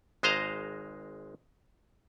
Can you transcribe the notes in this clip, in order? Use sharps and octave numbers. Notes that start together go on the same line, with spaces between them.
G#1 G#3 C5 D#5 F5 A#5